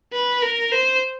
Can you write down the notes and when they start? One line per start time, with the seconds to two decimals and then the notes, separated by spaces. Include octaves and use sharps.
0.13 B4
0.42 A#4
0.72 C5